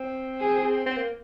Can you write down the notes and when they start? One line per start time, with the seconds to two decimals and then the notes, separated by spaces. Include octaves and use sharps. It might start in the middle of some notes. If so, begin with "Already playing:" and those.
Already playing: C4
0.40 G#4
0.86 C4
0.97 A#3